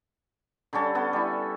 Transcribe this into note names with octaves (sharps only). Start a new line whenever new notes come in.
D3 G3 C#4 A4
B3 A4
G3 E4